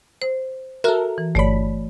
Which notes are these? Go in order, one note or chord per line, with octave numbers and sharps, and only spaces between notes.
C5
F#4 A4 A#4 E5
E3
G1 A3 C#5 D5 B5